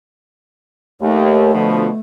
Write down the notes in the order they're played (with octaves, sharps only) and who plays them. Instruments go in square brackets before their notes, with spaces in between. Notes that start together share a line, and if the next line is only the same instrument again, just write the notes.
[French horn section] D#2 [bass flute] A3
[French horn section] B2 D3 F3